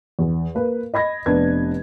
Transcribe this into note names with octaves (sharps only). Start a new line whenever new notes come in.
E2
A#3 B4
D#5 B5 G#6 A#6
F1 B3 D4 B4 G#6